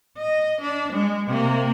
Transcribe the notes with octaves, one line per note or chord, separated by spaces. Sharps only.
D#5
D4
G#3
C3 A#3